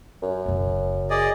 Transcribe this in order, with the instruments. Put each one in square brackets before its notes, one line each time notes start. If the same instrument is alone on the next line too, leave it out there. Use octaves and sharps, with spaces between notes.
[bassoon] F#2
[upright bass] F#1 C#3
[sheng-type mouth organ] G#4 D5 D#5